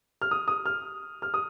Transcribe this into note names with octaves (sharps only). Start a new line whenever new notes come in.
F6
D#6
D#6
F6
F6
D#6